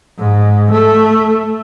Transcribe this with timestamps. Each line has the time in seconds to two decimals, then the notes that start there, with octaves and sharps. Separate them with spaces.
0.18 G#2
0.71 A3